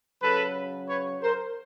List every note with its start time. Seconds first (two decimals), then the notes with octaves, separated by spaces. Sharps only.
0.22 C#3 F#3 A4 B4
0.89 B4 C#5
1.22 A#4 C5